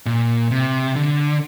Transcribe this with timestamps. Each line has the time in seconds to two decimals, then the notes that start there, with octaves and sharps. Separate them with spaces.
0.06 A#2
0.51 C3
0.96 D3